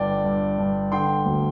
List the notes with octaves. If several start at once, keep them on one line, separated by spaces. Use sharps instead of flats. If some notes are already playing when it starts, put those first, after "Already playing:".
Already playing: G1 G2 D5 G5
G2
G2
D3 G5 C6
D2